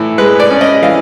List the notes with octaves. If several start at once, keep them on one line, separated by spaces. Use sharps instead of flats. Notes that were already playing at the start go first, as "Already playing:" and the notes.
Already playing: A2 E3
G#3 B4
D5
C#4
D#5
E3 F5